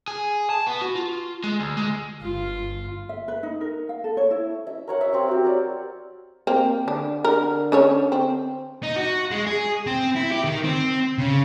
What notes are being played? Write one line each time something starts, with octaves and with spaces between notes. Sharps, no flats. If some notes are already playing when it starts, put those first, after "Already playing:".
G#4
A5
B3
F#4
F4
G#3
D2
G#3
G1 F4
E5
B4
D#4
A#4
F5
A4
C#5
E4
E5
A#4 C#5 F#5
E5
C4 G4 F5
F#4 G4
A#4 C#5 D5
A#3 C4
D3 D4
A#4
C#4 A4 C#5
C4
D#4
F#4
G#3
G#4
C4
E4
G4
D#3
C4
C#3